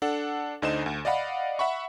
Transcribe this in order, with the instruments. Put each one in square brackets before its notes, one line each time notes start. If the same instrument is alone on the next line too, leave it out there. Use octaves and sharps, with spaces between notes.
[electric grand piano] D4 A4 F#5
D2 D3 D#4 C5 D#5 E7
D2
D5 D#5 F5 F#5 B5
E5 F#5 B5 C#6